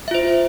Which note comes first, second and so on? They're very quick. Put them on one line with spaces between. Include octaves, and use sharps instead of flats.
E5 F4 C5